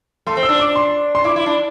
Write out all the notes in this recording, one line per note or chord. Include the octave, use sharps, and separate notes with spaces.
A3 C6
C4
E6
D4
D6
C6
C6
E4 D6
E4
D4